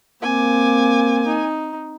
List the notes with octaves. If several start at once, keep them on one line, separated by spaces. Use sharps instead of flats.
A#3 C4 G#5 D6
D#4